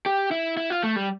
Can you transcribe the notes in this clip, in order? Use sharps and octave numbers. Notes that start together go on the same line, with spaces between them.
G4
E4
E4
F4
A3
G3